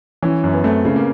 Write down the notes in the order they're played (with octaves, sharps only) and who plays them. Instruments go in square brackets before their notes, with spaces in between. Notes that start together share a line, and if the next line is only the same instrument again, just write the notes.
[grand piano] E3 [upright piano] C#4
[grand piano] F#2
[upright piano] B3
[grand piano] A3 [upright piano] C4
[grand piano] C#3
[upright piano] A#3